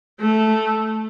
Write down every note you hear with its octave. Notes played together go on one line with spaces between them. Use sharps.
A3